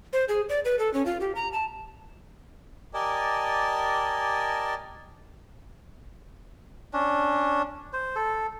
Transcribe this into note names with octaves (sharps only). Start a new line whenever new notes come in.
C5
G#4
D5
B4
A4
C#4
F4
G4
A#5
A5
G4 A#4 D5 D#5 G#5 A5
C#4 D4
C5
A4